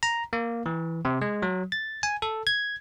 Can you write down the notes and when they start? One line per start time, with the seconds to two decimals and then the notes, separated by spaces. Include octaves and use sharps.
0.03 A#5
0.33 A#3
0.66 E3
1.05 C3
1.21 G#3
1.42 F#3
1.72 A6
2.03 G#5
2.22 A4
2.47 G#6